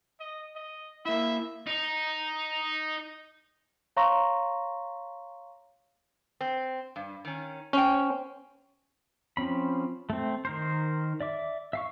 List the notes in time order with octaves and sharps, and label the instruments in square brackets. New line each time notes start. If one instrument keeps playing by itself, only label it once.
[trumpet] D#5
D#5
[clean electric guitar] A#3 E4 [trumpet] E5
[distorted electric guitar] D#4
[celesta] C#5 F5 A#5 C6 C#6 A#6
[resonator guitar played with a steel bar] C4
G2
D#3 C#4
[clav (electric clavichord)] C#4 [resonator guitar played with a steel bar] C5 G5
[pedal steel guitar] F3 C4 C#4 B5
A3 C4
D#3 A#4 C5
D5 E5 D6
E5 F5 C#6